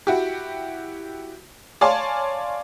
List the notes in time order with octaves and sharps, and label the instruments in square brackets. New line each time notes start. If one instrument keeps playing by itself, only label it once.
[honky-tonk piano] E4 F#4 G4
C#5 D5 F5 G#5 A5 C6